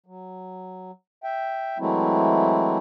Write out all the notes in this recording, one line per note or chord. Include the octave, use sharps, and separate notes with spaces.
F#3
E5 G5
E3 F#3 G#3 A3 C4 E4